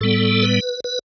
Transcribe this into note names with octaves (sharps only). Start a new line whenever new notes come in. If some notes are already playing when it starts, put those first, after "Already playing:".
A2 G3 B3 A4
B4
B4